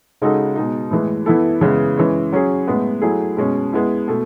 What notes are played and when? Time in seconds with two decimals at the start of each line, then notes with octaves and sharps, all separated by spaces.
0.22 C#3 G#3 D#4 F#4 A4
0.56 B2 G#3 D#4
0.91 A2 E3 G#3
1.26 E3 B3 E4 A4
1.61 C#3 E3 G#3 B3
1.97 E3 G#3 C#4
2.32 F#3 C#4 G#4
2.67 A2 G#3 B3
3.02 F#3 A3 E4 G#4
3.37 B2 G#3 C#4
3.73 G#3 B3 E4
4.08 B2 A3